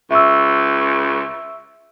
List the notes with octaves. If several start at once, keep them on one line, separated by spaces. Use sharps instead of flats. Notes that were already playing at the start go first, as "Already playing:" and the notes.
C#2 E5 C#6 E6